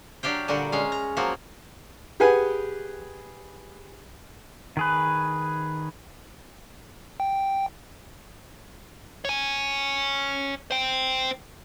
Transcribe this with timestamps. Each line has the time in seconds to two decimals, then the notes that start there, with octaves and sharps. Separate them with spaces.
0.23 F#3 D4 G4 F5 G5
0.48 A#2 D3 G3 F#4
0.72 G#3 C#4 F5
0.92 A#5
1.17 F3 F#3 A#3 F#4
2.20 G4 G#4 B4 F#5 G#5
4.77 D#3 G#4 B4
7.20 G5
9.25 C#5 G#5
10.71 C5 G5